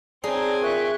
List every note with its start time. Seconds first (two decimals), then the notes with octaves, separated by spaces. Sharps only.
0.24 C4 D4 D#4 G#4 C#5 G#5
0.62 A#2 E5 C#6 F#6